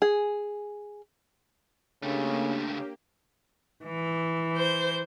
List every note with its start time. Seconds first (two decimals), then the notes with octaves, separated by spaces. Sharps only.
0.02 G#4
2.03 C#2 C#3 A3 A#3 D4 G4
3.84 E3
4.55 C5 G6